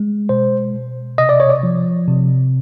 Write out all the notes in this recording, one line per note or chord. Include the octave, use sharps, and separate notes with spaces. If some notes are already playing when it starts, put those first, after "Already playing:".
Already playing: G#3
B2 C5
B2
C3 D#5
D5
C#5
D5
F3
C3